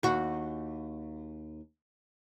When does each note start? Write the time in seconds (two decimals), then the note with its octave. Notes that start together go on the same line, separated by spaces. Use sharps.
0.03 D#2 F#4